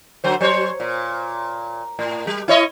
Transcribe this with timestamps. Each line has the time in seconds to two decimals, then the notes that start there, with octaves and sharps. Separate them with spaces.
0.24 D3 F#3 C5
0.41 F#3 C5 C#5
0.80 A#2
1.99 A2
2.27 G3
2.48 E4 C#5 D#5